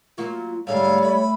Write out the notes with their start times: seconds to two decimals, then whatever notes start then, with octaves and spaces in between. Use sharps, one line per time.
0.18 F#3 A#3 F4 F#4
0.67 G#2 D3 G3 A3 C#5 F5
1.03 A3 B5